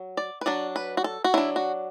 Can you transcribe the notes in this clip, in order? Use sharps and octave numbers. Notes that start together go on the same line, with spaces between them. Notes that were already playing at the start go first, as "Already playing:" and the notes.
Already playing: F#3
D5
B4
F#3 D4 D5
B4
F#4
A4
F#4
F#3 D4 E4
F#4